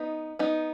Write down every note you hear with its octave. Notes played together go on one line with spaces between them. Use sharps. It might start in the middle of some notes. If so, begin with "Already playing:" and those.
Already playing: B3 D#4
B3 D#4